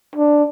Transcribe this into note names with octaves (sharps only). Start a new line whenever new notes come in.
D4